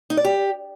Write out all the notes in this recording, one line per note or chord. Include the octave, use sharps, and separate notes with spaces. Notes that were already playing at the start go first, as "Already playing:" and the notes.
D#4
D5
G4